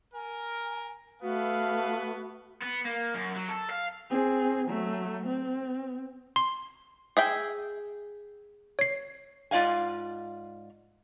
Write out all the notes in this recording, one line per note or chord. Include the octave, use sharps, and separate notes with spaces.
A#4 G#5
A3 B3 F#4 B4 F5
B3
A#3
F#2
F#3
A4
F5
C4 G#4
F#3 A3
C4
C6
G#4 E5 G5
C#5 C7
G#2 F4 D5 F5 G#5